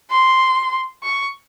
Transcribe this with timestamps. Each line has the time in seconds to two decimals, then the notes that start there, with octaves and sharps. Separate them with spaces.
0.11 C6
1.03 C#6